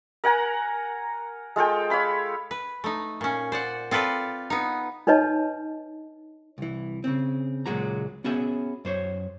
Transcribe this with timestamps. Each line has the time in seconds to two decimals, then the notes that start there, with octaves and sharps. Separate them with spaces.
0.24 A#4 F#5 G#5 A#5
1.56 G#3 F4 A4 G5
1.90 C#5 F5 B5 C6
2.51 B4
2.84 A3 D#4
3.21 A#2 C#4
3.52 C5 D5 F#5
3.91 C4 F4 A4 B4 D5
4.50 B3 D#4
5.07 D4 D#4 B4 C#5 D#5 A5
6.58 C2 E3
7.04 C#3 C4
7.66 C#2 A#2 F#3 G#3 F#4 A#5
8.24 B3 C#4 F#4 G#4 E5
8.85 F#2 C5 C#5